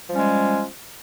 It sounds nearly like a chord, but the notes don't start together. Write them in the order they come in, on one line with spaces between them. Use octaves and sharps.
F3 G3 C#4 G#3